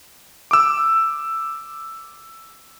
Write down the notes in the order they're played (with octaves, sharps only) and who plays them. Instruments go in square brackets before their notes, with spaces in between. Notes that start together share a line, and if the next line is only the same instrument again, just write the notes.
[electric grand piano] D6 E6